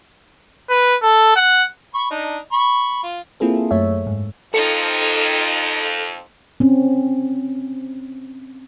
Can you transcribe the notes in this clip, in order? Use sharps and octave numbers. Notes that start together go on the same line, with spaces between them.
B4
A4
F#5
B5 C#6
D4 D#4
B5 C#6
F4
A#3 C4 E4 F4 G#4 A4
F#2 A3 C#5 E5
G#2
F2 D#4 F4 A4 C#7
C4 C#4